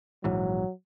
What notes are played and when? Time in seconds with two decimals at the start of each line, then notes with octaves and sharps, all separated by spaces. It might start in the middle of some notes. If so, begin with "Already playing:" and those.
0.24 A#1 G#2 E3 F#3